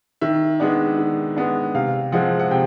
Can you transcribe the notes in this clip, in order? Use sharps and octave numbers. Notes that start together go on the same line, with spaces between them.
D#3 E5
G#3 B3 D4
D#3
G#3 B3 D4
C3 F5
F3 G#3 C4 F#5
F#5
C3 G5